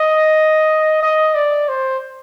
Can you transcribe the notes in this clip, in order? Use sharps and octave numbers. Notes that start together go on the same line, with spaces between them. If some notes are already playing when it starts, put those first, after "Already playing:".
Already playing: D#5
D#5
D5
C5